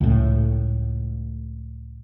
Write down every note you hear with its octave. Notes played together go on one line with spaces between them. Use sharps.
C#2 A2